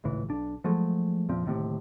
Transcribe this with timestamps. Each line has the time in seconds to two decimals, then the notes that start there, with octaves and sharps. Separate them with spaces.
0.04 G#1 C#2 A2 E3
0.29 B1 D4
0.64 F3 F#3 G#3 A3
1.29 E2 A#2 F3 C4
1.44 D1 D#2 A2 C3